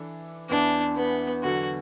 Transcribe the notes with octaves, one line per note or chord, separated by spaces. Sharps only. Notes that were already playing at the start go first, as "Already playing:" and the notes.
Already playing: E3 D4 A4
E2 E3 B3 D4
B3
E2 D3 F#3 F#4